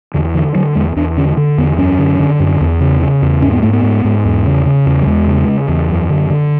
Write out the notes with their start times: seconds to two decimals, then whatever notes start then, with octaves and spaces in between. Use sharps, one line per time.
0.14 E2 D3
0.34 D3 E3
0.55 D3 F#3
0.75 E2 G#3
0.96 E2 D4
1.17 D3 C#4
1.37 D3
1.58 E2 B3
1.78 F#2 C#4
1.99 D3
2.19 D3
2.40 F#2
2.61 E2
2.81 C#3
3.02 C#3
3.22 E2
3.42 G#2 C#4
3.53 B3
3.63 G#2 A3
3.73 B3
3.83 G#2
4.05 G#2
4.24 E2
4.46 C#3
4.66 C#3
4.86 E2
5.02 F#3
5.06 E2 G#3
5.27 C#3
5.48 C#3
5.68 E2
5.89 F#2
6.09 D3
6.30 D3